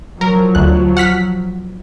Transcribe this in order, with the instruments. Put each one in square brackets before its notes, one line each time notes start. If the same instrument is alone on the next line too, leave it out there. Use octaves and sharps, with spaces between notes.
[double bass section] F3 F#3 [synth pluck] A#4
[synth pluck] D2 F#6
F#5 F6 B6